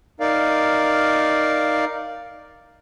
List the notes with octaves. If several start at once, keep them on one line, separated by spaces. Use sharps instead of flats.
D#4 A#4 D5 F5